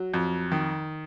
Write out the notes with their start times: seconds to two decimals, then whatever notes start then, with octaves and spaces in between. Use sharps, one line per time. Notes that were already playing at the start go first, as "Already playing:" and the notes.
Already playing: F#3
0.14 F2
0.52 D#3